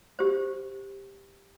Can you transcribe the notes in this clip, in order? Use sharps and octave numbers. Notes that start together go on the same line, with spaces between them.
G4 C5